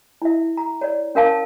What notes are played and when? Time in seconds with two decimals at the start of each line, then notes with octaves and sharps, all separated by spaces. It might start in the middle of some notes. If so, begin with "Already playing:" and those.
0.22 E4 E5
0.57 A#5
0.81 C#5 D5
1.15 C#4 A#4 F5 A5